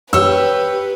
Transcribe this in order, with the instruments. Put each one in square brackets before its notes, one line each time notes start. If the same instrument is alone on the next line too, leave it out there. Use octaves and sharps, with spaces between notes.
[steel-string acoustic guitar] G4 C#5 [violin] B4 [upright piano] E6